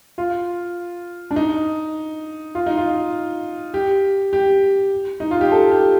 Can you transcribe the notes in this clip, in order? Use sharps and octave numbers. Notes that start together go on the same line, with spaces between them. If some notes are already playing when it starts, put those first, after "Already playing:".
F4
D4
D#4
F4
D#4
F4
G4
G4
D#4
F4
G4
A4
G4